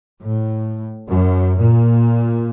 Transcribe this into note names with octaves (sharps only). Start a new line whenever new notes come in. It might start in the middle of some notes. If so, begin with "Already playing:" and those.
A2
F#2
A#2